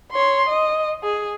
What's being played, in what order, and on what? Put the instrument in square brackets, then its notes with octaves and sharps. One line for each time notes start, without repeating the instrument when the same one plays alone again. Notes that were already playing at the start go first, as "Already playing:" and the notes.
[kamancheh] C#5 C6
D#5
G#4